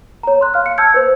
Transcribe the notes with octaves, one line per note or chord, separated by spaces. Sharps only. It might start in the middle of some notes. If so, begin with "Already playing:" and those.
C#5 A#5
C6 F#6
F5 F6
C#7
A5 E6 G6 G#6 C#7
B4 C5